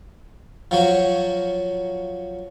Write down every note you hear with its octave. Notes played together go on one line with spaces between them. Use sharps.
F3 F#3 F#4